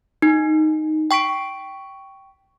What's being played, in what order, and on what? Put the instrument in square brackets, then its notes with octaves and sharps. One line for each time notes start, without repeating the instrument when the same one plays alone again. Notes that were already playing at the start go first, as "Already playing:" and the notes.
[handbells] D#4
G5 C#6 B6 D7